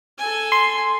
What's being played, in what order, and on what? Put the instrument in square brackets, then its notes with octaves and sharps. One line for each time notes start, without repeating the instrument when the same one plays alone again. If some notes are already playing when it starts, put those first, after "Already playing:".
[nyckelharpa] A4 G#5
[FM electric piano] C6